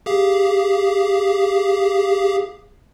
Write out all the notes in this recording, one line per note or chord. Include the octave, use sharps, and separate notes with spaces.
G4 G#4 F5